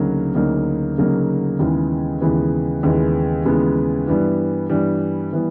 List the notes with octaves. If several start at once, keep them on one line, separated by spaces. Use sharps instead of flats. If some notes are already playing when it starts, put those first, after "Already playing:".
Already playing: D2 C#3 F#3 A#3 D#4
D2 C#3 F#3 A#3 D#4
D2 C#3 F#3 A#3 D#4
D#2 C#3 E3 G#3 B3
D#2 C#3 E3 G#3 B3
D#2 C#3 E3 G#3 B3
D#2 C#3 E3 G#3 B3
G2 E3 G3 B3
G2 E3 G3 B3
E3 G3 B3